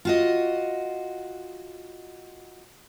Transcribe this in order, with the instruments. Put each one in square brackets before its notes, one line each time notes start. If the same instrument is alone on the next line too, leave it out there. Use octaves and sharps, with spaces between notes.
[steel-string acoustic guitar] F4 F#4 D#5